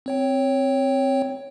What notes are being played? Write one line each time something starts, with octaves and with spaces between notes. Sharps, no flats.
C4 C#5 G5